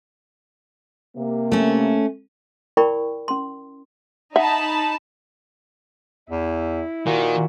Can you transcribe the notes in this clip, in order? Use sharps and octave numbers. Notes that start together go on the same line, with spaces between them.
C3 A#3
A3 C#4
E4 A#4 D5 G5 B5 C#6
C#4 C6
D#4 E5 F#5 A5 B5
E2 E4
A#2 D#3 F#4